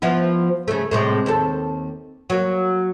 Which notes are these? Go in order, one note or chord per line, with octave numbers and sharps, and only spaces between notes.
F3 B3 E4
C#3 A3
A2 C3 G#3
D#2 C4 A4
F#3 A#3